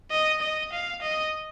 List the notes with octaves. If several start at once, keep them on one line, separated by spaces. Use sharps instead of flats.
D#5
D#5
F5
D#5